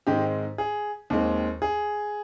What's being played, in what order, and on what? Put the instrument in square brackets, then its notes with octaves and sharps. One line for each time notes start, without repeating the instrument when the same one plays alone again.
[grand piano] G#2 D#3 G#3 C4 G4
G#4
D#2 D#3 G#3 C4
G#4